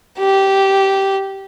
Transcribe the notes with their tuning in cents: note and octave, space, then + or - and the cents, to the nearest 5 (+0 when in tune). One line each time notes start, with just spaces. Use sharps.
G4 -15